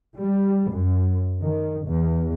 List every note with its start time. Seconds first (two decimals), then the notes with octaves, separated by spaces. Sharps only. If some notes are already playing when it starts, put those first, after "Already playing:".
0.19 G3
0.72 F#2
1.40 D#3
1.87 E2